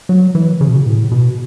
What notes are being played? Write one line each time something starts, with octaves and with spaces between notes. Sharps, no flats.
F#3
E3
C#3
B2
C#3
A2
B2